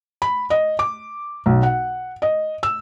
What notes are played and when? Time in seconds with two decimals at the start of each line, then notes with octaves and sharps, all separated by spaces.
0.22 B5
0.50 D#5
0.79 D6
1.46 B1
1.63 F#5
2.22 D#5
2.63 E6